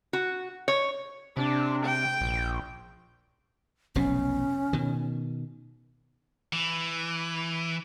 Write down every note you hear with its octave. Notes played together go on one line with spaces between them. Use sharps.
F#4
C#5
C3 D4
G5
A#1
F1 B1 B2 C#4
B2 D#3
E3